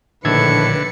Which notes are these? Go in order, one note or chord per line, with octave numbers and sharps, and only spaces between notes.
A#1 A2 D3 D#3 B4 E6 G#6 C#7